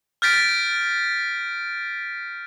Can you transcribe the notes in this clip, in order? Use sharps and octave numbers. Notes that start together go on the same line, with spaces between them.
F6 G6 A6 B6 D7